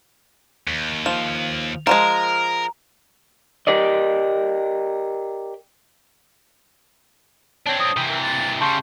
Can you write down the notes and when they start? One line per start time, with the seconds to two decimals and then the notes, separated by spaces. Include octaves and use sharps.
0.68 D#2
1.06 F3 F7
1.87 F3 G3 G#3 A#4 A#5
3.67 G4 A#4 D5 D#5
7.66 C4 D4 C#5 A5
7.80 D#6
7.97 C3 E3 G5 G6
8.08 A#4
8.21 A6
8.61 C#3 G3 A5 C6 C#6 G6